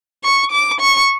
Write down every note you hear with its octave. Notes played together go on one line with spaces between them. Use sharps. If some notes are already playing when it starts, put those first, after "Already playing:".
C#6
D6
C#6